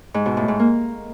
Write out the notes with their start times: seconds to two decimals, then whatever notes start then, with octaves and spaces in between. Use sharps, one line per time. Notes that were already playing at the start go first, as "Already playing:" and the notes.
0.14 G#2
0.26 B2
0.37 A2
0.48 G#2
0.59 A#3